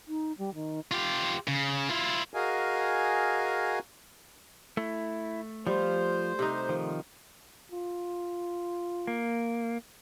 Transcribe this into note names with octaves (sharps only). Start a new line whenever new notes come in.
D#4
G3
D#3
F4 G4
C#3
E4 F4
F#4 G#4 A#4 D#5 F5 G#5
A3 E4
F3 G3 F4 C5
C3 D#4
D#3 F3
F4
A#3